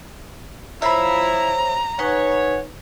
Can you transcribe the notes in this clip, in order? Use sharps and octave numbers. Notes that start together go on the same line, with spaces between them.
F3 E4 C5 C#5 E5 A#5 B5
D#4 B4 C#5 F#5 G#5